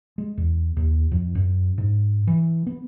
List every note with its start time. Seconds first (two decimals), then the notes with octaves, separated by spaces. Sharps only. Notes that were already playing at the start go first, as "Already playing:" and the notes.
0.18 G#3
0.38 E2
0.77 D#2
1.12 F2
1.35 F#2
1.78 G#2
2.27 E3
2.67 B3